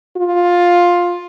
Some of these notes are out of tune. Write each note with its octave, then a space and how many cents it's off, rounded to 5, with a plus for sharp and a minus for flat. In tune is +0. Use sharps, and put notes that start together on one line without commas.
F4 +10